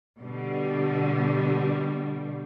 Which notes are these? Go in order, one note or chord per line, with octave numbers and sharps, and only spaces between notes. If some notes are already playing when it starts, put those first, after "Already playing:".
B2 D3 G3